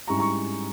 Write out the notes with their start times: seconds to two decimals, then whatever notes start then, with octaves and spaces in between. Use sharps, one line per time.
0.07 G#2 G3 C#4 E4 A#5 C#6
0.19 A#5 C#6